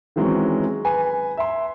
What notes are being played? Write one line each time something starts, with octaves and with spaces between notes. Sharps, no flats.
D#3 E3 F#3 G#3 C4 C#4
B4 G#5
E5 C6